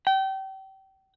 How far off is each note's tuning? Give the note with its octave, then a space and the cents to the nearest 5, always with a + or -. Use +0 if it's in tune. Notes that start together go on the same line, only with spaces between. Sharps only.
G5 -30